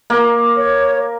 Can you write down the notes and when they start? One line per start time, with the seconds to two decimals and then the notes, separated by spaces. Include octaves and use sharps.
0.10 A#3
0.57 C#5